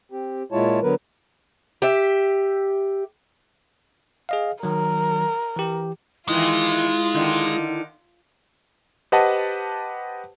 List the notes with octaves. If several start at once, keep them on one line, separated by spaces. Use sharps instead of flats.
C4 G4
A#2 G#3 E4 F4 C#5 A5
D3 F#3 B3 A#4 B4
G4 E5
G#4 D#5 F5
D#3 F#3 A#4
E3 G4
D#3 E3 G#3 E4 F4
D3 D#3
G4 B4 C5 D#5 F#5 A5